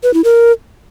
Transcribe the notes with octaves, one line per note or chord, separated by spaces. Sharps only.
B4
E4
A#4